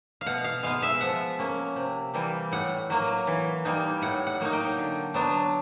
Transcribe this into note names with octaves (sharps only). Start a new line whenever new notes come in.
F5
B2 F#5
F5
G#3 B3 F5
E5
F3 F#5
A#3 C#4
C3
E3 G3 A#3
A2 F#5
F#3 A#3
E3
G3 A#3 D#4
A2 F#5
F#5
F#3 A#3 D#4
G5
D3
F#3 B3 D4